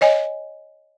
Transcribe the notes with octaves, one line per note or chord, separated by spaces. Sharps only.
C#5 D#5 G#5